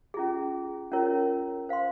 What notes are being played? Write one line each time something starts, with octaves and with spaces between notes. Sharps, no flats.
C#4 F4 G#4
C#4 F4 A#4 C#5
C5 F5 C6